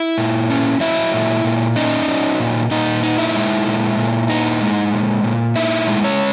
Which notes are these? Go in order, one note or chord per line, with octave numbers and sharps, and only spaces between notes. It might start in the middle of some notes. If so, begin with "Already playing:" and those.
Already playing: E4 E5
A#2
C#4
F#3 E4 E5
A#2
A#2
C#4 D#4 D#5
F#3
A#2
A#2 D#4 D#5
D#4
E4 E5
G#3
A#2
A#2
D#4
G#3
A#2
A#2
D#4 E4 E5
G#3
C#4 C#5